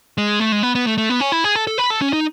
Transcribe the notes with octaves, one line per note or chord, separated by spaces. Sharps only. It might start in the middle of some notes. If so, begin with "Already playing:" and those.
G#3
A3
G#3
B3
B3
A3
A3
B3
C#4
E4
G#4
A4
A4
B4
A4
C#4
D#4